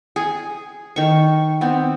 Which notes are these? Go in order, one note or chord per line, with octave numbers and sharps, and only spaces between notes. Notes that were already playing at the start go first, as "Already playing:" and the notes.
G#4
D#3 C#6
B3 C4